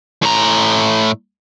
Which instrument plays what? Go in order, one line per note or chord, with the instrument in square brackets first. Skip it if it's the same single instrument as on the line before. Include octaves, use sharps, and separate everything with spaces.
[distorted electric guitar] A2 A#5